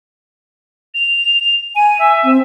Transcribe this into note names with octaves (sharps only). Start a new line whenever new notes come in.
F7
G#5 D#7
E5
C4